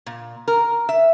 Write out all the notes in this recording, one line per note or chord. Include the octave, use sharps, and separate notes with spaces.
A#2
A#4
E5